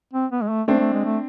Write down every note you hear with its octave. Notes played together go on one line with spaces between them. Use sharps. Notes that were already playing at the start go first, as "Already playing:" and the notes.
C4
B3
G#3
A3
A3 C4 D4
A3
G#3
A3